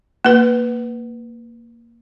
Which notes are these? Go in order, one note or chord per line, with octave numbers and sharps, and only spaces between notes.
A#3 B4